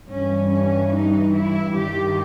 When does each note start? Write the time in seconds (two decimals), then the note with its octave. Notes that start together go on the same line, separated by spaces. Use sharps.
0.10 G2 E3 C#4
0.52 C#4
0.94 D#4
1.35 E4
1.76 G2 D#3 G4